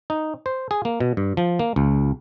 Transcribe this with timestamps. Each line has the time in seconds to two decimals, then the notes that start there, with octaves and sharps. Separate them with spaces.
0.10 D#4
0.46 C5
0.71 G#4
0.85 A#3
1.00 B2
1.17 G2
1.37 F3
1.59 A#3
1.76 C#2